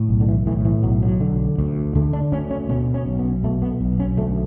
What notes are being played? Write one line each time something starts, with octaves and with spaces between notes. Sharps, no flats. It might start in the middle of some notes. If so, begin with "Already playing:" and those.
Already playing: A2
B1
D3
E3
A2 E3
E3
B1 F#3
F#3
D3
D2
D3 A3
D4
D2 C#4
C#4
B2 C#4
C#4
B1
B3
B2 A3
B3
B1
C#4
D2 A3